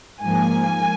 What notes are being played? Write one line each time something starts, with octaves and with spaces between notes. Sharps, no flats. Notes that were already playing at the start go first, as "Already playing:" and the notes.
G#2 F3 A#3 G#5